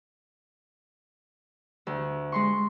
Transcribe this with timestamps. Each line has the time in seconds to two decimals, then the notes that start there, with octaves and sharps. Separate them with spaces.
1.87 D2
2.32 G#3 C6 C#6